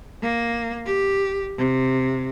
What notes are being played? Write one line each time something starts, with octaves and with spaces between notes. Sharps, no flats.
A#3
G4
C3